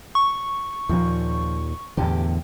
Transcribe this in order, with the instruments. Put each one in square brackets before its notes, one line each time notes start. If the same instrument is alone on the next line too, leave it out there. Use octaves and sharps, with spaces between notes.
[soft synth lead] C#6
[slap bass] D#2 A#2 [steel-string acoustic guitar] F3
[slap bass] E2 A2 D3 [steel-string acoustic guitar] G4